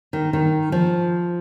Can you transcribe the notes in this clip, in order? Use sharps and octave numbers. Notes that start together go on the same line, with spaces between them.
D#3
D#3
F3